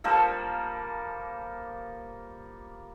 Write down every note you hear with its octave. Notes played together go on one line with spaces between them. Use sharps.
F3 G3 A#3 A4